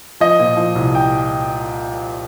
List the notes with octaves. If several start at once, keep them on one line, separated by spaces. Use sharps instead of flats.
F3 D#5
A#2
F3
C2
G5